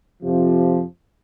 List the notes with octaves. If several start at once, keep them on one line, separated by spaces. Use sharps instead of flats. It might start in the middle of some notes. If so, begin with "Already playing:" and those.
F2 C3 F3